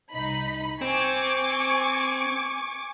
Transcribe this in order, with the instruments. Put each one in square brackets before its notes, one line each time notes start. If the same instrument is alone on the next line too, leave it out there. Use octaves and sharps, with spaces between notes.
[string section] C2 D#4 B5
[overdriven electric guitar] C4 [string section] G#5 C#6 D6